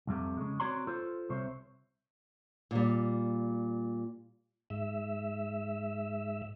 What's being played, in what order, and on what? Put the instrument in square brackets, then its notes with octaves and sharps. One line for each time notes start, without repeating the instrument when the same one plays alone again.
[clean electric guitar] C2 F2 C3 A3
C#3 G#3
C4 F#4 C#5 D5 A#5 C6
F4 A4 C5
C2 C3 C5 C#5 E5
[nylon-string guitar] A#2 G3
[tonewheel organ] G#2 E5